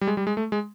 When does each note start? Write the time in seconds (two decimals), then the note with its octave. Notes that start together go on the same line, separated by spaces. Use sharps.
0.01 G3
0.07 G#3
0.17 G3
0.27 G#3
0.37 A3
0.52 G#3